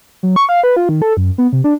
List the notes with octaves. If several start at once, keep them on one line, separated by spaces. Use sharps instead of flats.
F#3
C#6
F5
B4
F4
D#3
A4
F#2
B3
C3
D4